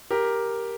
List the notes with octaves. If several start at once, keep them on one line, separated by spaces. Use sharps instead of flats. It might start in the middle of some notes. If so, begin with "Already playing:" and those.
G4 A#4